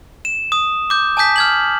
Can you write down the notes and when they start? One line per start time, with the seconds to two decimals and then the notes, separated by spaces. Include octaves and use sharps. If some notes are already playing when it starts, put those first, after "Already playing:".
0.25 E7
0.52 D#6
0.90 D6 G6
1.17 G#5 A5 D#6 G6 B6
1.36 F6 G#6 F#7